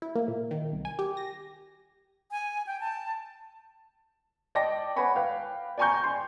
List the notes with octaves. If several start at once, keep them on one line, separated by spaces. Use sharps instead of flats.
E4
A#3
A#2
D#3
C2
G#5
G4
A#6
G#5
G5
A5
D5 D#5 G5 A5 D6 A#6
B4 C#5 F#5 G#5 B5 C#6
B4 F5 G5
D5 G5 G#5 A#5 C#6 G6
G#5 C6